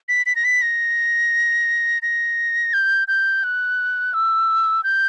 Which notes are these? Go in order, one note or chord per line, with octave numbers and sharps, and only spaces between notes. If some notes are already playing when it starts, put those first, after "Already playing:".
B6
B6
A#6
B6
A#6
A#6
G6
G6
F#6
E6
G6